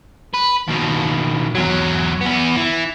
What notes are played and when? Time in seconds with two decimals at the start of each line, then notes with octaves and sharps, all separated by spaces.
0.34 B4
0.68 D#2 B2
1.55 E2 F#3
2.21 E2 B3
2.56 E3